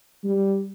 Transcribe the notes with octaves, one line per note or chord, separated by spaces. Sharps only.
G3